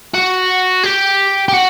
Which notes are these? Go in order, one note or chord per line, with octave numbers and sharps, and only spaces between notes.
F#4
G4
G4
F#4